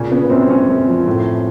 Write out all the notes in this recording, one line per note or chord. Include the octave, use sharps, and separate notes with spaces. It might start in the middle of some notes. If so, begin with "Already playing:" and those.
Already playing: A#2 C#3 C#4
C#3 B3
F#2 C4
F#2 C#4
F#2
F3
A2